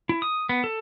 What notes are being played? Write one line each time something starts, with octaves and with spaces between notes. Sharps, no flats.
E4
D#6
B3
A4